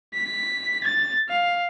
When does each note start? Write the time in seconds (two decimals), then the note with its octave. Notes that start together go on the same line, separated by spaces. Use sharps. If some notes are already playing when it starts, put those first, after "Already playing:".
0.14 B6
0.84 A6
1.29 F5